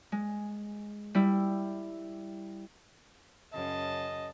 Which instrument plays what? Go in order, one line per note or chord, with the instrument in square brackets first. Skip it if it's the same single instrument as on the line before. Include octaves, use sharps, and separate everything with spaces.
[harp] G#3
G3 E4
[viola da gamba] F#2 C#3 [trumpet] D#5 [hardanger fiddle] A5